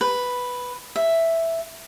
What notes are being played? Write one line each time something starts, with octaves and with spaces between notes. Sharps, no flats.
B4
E5